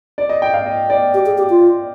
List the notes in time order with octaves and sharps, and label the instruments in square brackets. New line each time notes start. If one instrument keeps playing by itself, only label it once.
[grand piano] D5
D#5
G5
F5
D#5
D5
[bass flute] G4
G#4
G4
F4